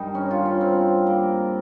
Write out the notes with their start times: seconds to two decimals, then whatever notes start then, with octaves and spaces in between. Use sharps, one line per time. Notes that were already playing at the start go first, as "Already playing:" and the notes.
Already playing: G2 D#3 G3 D#4
0.15 C#4
0.31 F4
0.45 C#4
0.61 C4
1.07 A#3